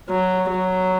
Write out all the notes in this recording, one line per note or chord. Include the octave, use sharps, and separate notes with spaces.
F#3
F#3